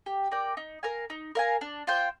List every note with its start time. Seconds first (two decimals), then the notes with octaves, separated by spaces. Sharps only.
0.06 G4
0.31 A#4 D5 G5
0.57 D#4
0.83 A#4 F5 G#5
1.10 D#4
1.35 A#4 F5 G#5
1.61 D4
1.87 F4 C5 G5